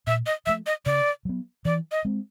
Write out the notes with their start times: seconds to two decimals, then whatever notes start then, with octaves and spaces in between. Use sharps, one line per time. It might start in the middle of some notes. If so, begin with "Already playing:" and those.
0.07 A#2 E5
0.26 D#5
0.46 F3 A3 E5
0.66 D#5
0.86 C#3 D5
1.25 F#3 B3
1.65 E3 D5
1.92 D#5
2.05 G#3 C4